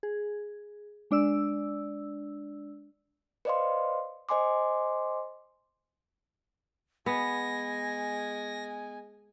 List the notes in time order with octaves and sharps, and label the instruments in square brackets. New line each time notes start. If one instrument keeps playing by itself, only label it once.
[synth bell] G#4
G#3 D4 D5 E6
[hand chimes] B4 C5 D5 D#5 F5 C6
C5 D#5 G#5 C6 D6
[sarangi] G#3 [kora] B3 [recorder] G#5 [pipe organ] A#6